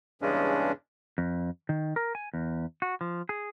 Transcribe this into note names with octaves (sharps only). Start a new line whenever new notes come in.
E2 G2 C#3 G#3 C#4 D4
F2
D#3
A#4
G#5
E2
F#4
F3
G#4